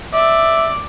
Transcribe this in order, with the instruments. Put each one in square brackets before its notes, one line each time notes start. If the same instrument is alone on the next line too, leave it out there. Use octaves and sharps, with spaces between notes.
[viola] D5 [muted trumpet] E5